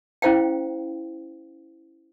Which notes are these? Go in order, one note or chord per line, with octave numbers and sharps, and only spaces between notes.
C#4 E4 C5 F5 G5